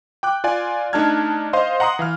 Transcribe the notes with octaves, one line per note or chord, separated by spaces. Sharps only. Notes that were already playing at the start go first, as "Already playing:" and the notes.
G5 D6 F#6
F4 D5 G#5
A3 D4 D#4 A5 F6 G#6
C5 D#5 F5 C6
F#5 A#5 C6 D#6
E3 F5 F6